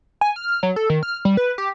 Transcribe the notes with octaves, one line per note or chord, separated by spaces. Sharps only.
G#5
F6
F#3
A4
D#3
F6
G3
B4
G4